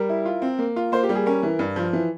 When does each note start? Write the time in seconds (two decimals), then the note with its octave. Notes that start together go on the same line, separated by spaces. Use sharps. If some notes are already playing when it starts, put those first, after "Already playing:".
Already playing: G3 A#4
0.09 E4
0.25 F4
0.42 C4
0.59 A#3
0.76 F4
0.92 A#3 C5
1.03 G4
1.09 G3
1.15 G#4
1.26 C#4 A#4
1.43 E3
1.59 G2
1.76 F3
1.93 E3